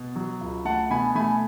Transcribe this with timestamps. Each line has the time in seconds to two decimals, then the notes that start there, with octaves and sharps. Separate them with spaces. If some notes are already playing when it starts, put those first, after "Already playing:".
Already playing: B2
0.16 F#3
0.41 C#2
0.65 A3 F#5 A5
0.91 B2 G#5 B5
1.15 A3 G#5 B5